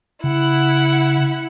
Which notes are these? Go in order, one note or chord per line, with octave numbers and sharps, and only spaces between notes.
C#3 E4 F#5